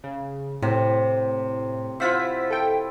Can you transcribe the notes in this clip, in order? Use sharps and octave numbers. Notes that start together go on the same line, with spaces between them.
C#3
A2 C3
E4 F4 C5 E5 F#5 B6
A4 G5